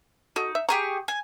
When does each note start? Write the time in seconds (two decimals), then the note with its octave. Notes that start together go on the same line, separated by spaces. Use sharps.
0.36 D#4 F#4 A4
0.55 E5
0.69 G4 G#4 A#5 C#6
1.08 G#5